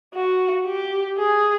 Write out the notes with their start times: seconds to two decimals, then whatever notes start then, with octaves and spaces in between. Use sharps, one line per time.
0.14 F#4
0.66 G4
1.18 G#4